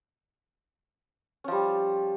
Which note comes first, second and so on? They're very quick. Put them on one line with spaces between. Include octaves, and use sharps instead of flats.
C#4 F3 G3